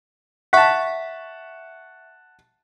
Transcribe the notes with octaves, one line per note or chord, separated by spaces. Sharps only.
E5 F#5 A5 C#6 B6